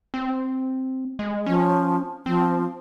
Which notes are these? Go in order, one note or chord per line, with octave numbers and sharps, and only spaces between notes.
C4
G#3
F3 C#4
F3 C4